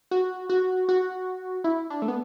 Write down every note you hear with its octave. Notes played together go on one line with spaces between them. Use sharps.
F#4
F#4
F#4
E4
D4
A3
B3